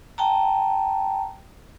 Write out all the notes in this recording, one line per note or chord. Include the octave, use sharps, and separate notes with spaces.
G5 A5 A#5